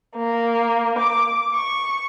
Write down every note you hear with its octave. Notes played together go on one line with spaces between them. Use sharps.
A#3
D6
C#6